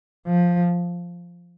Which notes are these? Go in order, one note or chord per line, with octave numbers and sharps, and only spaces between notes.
F3